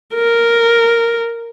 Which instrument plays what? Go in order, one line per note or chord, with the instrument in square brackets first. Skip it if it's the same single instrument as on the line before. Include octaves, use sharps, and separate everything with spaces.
[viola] A#4